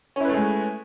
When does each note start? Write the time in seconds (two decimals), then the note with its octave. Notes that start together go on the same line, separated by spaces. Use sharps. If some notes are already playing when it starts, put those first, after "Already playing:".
0.16 C#4
0.20 E4
0.25 B4
0.29 A3
0.34 G#3